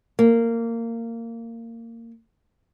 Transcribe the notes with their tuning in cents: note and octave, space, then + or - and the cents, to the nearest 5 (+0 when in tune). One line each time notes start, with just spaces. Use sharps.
A#3 -20